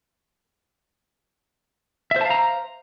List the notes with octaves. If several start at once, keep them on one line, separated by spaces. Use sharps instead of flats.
C5 E5 F5 A5 A#5